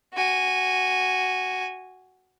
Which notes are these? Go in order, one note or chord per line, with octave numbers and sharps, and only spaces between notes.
F#4 G#5